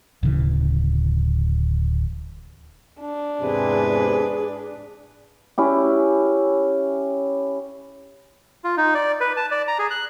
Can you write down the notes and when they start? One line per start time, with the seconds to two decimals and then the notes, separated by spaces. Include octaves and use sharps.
0.23 D1 C#3 E3
3.00 D4
3.41 E2 G#2 C3 G#4 B4 G#5
5.58 C#4 E4 G4
8.64 F4
8.77 D#4
8.95 D5
9.21 B4
9.37 A5
9.51 D5
9.68 A#5
9.79 G#4
9.91 F#6